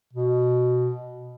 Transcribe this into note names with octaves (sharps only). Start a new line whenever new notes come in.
B2